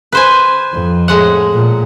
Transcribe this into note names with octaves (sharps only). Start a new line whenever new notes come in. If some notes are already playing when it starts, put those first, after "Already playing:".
B4 C5 G#5
F2
A2 G#3 F#5
A#2